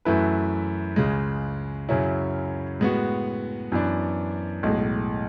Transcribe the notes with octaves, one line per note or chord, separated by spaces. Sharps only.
F#2 E3 A3 E4 B4
C#2 C#3 G#3
F#2 C#3 F#3 C#4 E4
A2 G#3 B3 F#4
F#2 E3 B3 D4
B1 A2 G#3